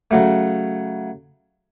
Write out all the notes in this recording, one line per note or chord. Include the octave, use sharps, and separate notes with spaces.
C#3 F#3 A3